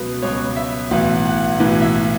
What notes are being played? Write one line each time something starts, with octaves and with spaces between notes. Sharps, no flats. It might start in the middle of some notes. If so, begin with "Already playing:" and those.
Already playing: C#2 B2 F#3 B4
C#2 B2 F#3 C#5
E5
B1 A2 E3 F#5
F#5
B1 A2 E3
E5